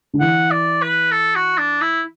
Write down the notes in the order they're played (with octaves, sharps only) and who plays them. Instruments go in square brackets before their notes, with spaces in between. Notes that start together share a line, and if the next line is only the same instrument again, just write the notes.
[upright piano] D3
[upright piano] E3 [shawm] F#5
[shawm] D5
B4
A4
F#4
D4
E4